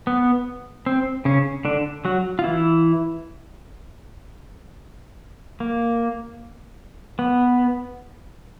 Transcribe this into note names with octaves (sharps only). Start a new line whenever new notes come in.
B3
C4
C#3 C#4
D3 D4
F#3 F#4
F4
E3 E4
A#3
B3